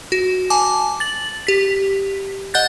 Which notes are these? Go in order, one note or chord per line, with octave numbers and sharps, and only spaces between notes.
F#4
G#5 A5 D6
A6 F#7
G4 B6
D#5 F#5 F#6 G6 A6